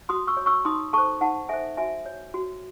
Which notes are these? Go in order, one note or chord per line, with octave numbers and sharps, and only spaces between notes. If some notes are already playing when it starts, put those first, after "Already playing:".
F#4 C6 D#6
C#6 E6
C#5
C#6 E6
D#4 C6 D#6
A4 C5 A5 C#6
D#4 F#5 A5
A4 C5 E5 G#5
F#4 E5 G#5
C#5
F#4